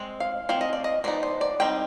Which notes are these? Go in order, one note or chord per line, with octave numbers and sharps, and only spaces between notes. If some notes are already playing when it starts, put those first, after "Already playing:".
Already playing: G#3 C4
F5
F3 C4 F5
D#5
D5
D#5
F3 B3 D#4 D5
C5
D5
G3 C4 D#4 G5